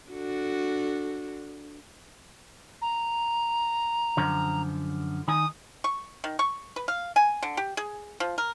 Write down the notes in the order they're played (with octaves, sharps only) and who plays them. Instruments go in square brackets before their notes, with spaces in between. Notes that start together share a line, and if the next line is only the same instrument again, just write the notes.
[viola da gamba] D4 F#4 A4
[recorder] A#5
[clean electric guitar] F#2 D3 F3
[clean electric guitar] D#3 D#4 G#5 [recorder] D#6
[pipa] C#6
D#3
C#6
B4
F5
G#5
D3
G4
G#4
F3
A#4